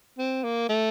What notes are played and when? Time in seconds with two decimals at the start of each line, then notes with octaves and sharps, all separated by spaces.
0.18 C4
0.44 A#3
0.69 A3